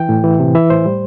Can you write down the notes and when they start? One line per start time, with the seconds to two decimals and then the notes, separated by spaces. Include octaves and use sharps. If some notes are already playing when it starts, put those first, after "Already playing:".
Already playing: E3 G5
0.09 A2
0.24 E3
0.40 C3
0.55 E3 E5
0.70 A2 C5
0.86 G3